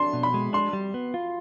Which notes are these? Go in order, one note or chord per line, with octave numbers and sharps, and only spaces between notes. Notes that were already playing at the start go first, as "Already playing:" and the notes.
Already playing: D4 C6
B2
B5
G#3
D4 C6
G3
B3
F4